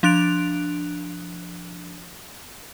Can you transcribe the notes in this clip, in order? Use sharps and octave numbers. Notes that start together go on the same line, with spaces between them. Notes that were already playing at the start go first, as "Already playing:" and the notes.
F3 D4 F#6 D7 F7